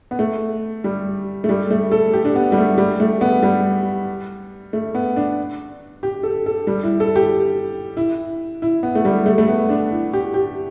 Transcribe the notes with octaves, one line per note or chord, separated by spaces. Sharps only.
B3
A3
G3
A3
G3
A3
A4
G4
D4
B3
G3
A3
G3
A3
B3
G3
A3
B3
D4
G4
A4
A4
G3
E4
A4
G4
E4
E4
B3
A3
G3
A3
A3
B3
D4
E4
G4
G4